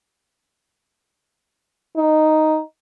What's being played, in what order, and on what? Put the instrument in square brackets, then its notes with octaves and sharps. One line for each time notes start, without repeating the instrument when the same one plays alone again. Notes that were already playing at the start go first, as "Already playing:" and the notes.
[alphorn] D#4